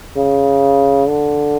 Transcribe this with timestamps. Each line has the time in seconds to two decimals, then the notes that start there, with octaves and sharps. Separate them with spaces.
0.17 C#3
1.08 D3